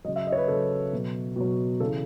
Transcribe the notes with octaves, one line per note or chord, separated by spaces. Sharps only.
C#3 F#3 D#5
E5
D#5
C#5
B4
C#3 F#3 A4
B2 F#3
B2 F#3
C#3 E3 A4